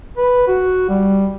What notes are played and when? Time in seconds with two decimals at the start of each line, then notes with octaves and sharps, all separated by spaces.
0.17 B4
0.48 F#4
0.89 G3